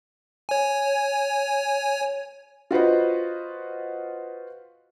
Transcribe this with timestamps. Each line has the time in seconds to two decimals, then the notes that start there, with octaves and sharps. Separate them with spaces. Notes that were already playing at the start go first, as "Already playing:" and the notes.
0.49 C#5 G#5
2.71 F4 F#4 B4 C5 D#5